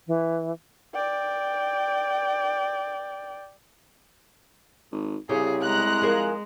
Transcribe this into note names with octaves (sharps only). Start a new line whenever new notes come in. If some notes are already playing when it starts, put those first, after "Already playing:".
E3
D5 G5
G#1
C2 C#3 C#4 G4 G#4
G#3 A#5 F#6
F3 G#4 A#4